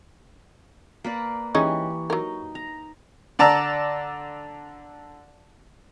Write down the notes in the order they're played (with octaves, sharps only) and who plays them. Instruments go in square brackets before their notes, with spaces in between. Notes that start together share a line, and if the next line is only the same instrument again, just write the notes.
[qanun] A#3 B4 D5
[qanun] E3 G4 [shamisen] G#3 C#4 D#4 [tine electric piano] C#6
[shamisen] F#3 A#4 [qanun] D#4
[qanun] A#5
[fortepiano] D3 D5 A5 A#5 E6